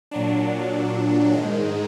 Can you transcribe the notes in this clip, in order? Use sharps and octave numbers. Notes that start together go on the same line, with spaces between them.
A#2 F#3 D4
G#2 D#3 G#3